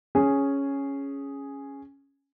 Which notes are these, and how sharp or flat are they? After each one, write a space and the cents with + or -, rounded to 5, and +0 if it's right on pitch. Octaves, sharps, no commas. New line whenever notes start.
C#4 +0 G#4 +0